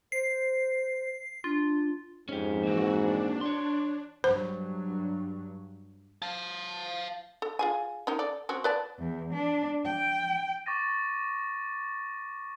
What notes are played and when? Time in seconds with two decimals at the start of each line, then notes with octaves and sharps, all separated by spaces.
0.12 C5 C7
1.44 D4 F4
2.29 F2 G#2 C#4 G4
2.63 E3 A#3 C4 F#4
3.01 D4
3.41 C#5 C6
4.24 G2 F#3 C5
6.22 F5 A5
7.42 A4
7.59 F4 G#4 G#5
8.07 C#4 D#4 A#4
8.19 A4 D5
8.49 C4 C#4 F#4
8.64 B4 D5 A5
8.99 E2
9.33 D4
9.85 G5
10.66 C#6 D6 A6 A#6 D#7